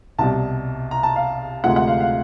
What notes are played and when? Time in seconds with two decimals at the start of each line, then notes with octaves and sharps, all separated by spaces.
0.18 C2 B2 G3 A5
0.91 A#5
1.03 A5
1.16 F5
1.64 D2 C3 F3 G#3 F#5
1.76 F#5
1.88 F5
2.00 F5